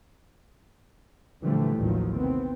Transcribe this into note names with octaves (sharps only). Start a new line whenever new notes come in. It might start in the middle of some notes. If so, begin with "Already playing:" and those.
A#2 D3 E3 F3 G3 A3
A1 D#2 A2 D#3 F3 F#3
C3 B3 C4